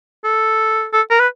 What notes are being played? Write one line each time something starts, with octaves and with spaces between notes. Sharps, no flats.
A4
A4
A#4
B4